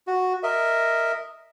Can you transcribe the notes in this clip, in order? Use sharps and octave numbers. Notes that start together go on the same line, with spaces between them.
F#4
A#4 D#5 E5